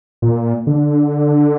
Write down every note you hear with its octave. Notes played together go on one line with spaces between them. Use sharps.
A#2
D3